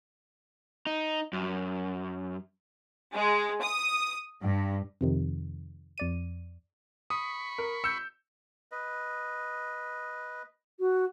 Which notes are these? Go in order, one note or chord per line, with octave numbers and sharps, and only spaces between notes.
D#4
F#2
G#3
D#6
G2
F2 C3 D#3
F2 D5 D#7
B5 C#6 D#6
A#4
E6 G6 C#7
B4 D#5
F#4